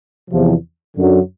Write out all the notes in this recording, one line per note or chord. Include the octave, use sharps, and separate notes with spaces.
E2 C3 F3
F#2 D3 F#3